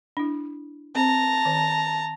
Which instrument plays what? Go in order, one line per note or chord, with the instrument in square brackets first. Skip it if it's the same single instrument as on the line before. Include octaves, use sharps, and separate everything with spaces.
[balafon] D4 E4
[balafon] C4 C5 [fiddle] A5 A#5
[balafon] D#3 C5